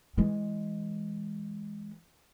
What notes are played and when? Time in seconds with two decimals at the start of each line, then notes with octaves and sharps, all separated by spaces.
0.17 E3 G#3